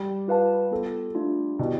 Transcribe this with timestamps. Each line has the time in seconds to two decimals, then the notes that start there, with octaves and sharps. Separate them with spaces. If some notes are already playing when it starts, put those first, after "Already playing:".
Already playing: G3
0.28 F4 B4 F5 A5
0.71 B3 F4 A4
1.15 A3 D4 F4
1.59 B2 E4 G4 D5 G5